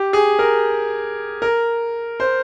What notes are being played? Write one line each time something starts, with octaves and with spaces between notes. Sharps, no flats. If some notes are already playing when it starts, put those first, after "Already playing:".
Already playing: G4
G#4
A#4
A#4
C5